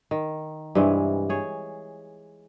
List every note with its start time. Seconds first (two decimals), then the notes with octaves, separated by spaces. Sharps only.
0.11 D#3
0.75 G2 C3 E3 G#3
1.29 G#4 C#5